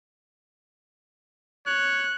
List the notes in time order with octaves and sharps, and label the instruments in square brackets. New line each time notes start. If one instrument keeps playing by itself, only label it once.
[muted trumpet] C#5 [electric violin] F#6